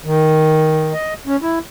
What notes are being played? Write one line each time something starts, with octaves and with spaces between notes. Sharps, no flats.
D#3
D#5
C#4
E4